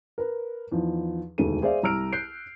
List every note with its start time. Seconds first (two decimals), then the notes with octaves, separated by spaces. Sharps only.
0.18 A#4 B4
0.72 E2 F3 D#4
1.38 E1 D2 D#3 A4 D#7
1.62 G#4 C5 D5 E5 F5
1.83 C2 A#5 E6 F6 D7
2.13 F#6 G6 C7 D7